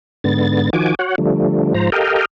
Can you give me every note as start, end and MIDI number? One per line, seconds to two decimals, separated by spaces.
0.24 0.70 44
0.24 0.70 50
0.24 0.70 59
0.24 0.70 93
0.73 0.95 51
0.73 0.95 53
0.73 0.95 66
0.73 0.95 80
0.73 0.95 86
0.99 1.15 66
0.99 1.15 73
0.99 1.15 78
1.18 1.73 50
1.18 1.73 53
1.18 1.73 55
1.18 1.73 57
1.74 1.90 44
1.74 1.90 53
1.74 1.90 72
1.74 1.90 82
1.92 2.25 67
1.92 2.25 69
1.92 2.25 70
1.92 2.25 75
1.92 2.25 77
1.92 2.25 79